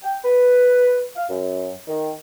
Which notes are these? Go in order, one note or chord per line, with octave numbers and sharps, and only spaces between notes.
G5
B4
F5
F#2
D#3